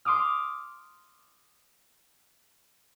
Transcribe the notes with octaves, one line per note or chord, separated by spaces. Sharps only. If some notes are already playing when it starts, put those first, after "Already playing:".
C6 D6 D#6 F6